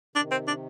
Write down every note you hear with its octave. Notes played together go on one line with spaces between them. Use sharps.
C3 D#3 D4
C4
D4